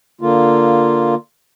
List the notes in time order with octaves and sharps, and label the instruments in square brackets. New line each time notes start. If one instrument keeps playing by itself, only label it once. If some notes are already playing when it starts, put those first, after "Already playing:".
[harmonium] D3 A#3 F4